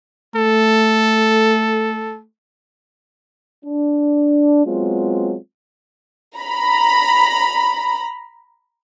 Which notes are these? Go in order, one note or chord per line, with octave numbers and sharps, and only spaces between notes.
A3 A4
D4
F#3 G#3 B3 C4 F4
A#5 B5